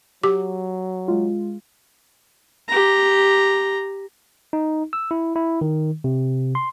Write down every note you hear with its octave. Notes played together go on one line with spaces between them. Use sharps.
F#3 G4 D6
G#3 F4
G4 A#5
D#4
E6
E4
E4
D#3
C3
C6